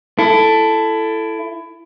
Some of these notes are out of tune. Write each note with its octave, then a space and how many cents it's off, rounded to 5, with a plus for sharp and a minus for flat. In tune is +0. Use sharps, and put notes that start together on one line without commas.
E4 +20 A4 +0